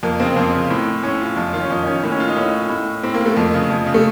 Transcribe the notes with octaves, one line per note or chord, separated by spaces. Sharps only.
F2 A#3
C#3 C4
F2 C4
C#3
A2
A2 C#4
F4
F2 F4
D#3 F4
C#4
F2 D#4
D#3 C#4
A2 A#3
C#4
F4
D#4
A2 C#4
A2
A2 C4
A#3
A3
F2
C#3
F2
C#3
A3